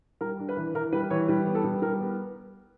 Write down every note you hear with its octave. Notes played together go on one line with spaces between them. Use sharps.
G3 A#4
D4
B4
E3
E3 A#4
G3 B4
E3 C#5
G3 B4
B3
A4
G3
G3 A#4
B3